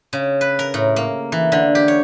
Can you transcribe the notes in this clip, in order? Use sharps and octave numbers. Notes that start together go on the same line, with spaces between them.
C#3
B4
A#4
A2
A#3
E3
D3
G4
C#5